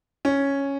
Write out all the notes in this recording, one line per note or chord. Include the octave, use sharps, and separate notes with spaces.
C#4